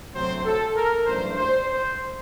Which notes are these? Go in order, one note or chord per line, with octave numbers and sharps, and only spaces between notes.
D2 C3 F#3 A3 C4 C5
A4
A#4
A1 G2 F#3 A3 D4 C5
C5
C5